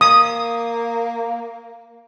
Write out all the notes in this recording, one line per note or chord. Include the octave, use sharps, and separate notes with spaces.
A#3 D#6